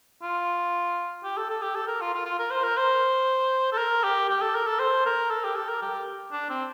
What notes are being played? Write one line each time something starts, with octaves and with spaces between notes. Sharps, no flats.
F4
G4
A4
A4
G4
A4
A#4
F4
F4
F4
A#4
C5
A#4
C5
A4
A#4
G4
G4
A4
A#4
A4
C5
A#4
A4
G4
A4
A#4
G4
D4
C4